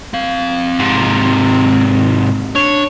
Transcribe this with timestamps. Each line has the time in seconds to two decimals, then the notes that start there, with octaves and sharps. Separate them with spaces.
0.14 C4 F5
0.80 G#2 C3
2.55 D4 C#5